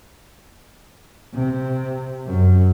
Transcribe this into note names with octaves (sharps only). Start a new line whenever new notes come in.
C3
F#2